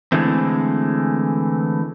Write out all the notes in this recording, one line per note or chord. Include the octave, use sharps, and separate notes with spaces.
D3 E3 G#3 A3 C4